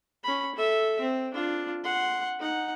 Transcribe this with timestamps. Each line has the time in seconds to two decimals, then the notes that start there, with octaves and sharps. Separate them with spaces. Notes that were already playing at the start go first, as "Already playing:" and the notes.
0.23 C#4 B5
0.56 A4 E5
1.00 C4
1.34 D4 F4
1.84 F#5 C6
2.39 D#4 F#5